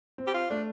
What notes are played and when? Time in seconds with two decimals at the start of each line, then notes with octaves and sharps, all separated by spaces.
0.18 C4
0.27 G4
0.34 F4
0.50 A3 D4